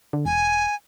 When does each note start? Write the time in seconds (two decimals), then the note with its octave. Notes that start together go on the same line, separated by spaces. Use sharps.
0.13 D3
0.26 E1 G#5